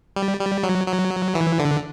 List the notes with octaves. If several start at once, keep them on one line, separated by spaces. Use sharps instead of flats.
G3
G3
F#3
F#3
E3
D3